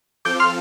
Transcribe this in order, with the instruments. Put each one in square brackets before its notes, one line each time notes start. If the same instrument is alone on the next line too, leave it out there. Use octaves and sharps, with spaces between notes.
[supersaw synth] F3 C4 F4 A4 [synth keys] D6 G6
[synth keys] C6 F6